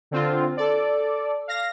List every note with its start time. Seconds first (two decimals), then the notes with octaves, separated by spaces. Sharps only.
0.11 D3 C4 F4
0.57 A4 D5
1.48 F5 A#6